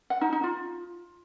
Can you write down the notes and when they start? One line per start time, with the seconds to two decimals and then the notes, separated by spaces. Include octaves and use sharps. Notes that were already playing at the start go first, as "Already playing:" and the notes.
0.10 F#5
0.21 D#4
0.33 D#4
0.44 F4